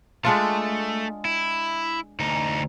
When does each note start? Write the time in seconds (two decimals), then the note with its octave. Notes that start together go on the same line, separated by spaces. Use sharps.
0.25 G#3 A3 D4 F4
1.25 E4
2.20 D2 D#4